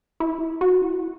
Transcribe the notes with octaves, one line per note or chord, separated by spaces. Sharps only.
E4
F#4
E4